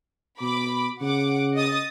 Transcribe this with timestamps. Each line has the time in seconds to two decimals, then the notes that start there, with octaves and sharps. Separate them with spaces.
0.41 B2 B5 D6
1.02 C#3 F#5 D6
1.55 D#5 D#6 A6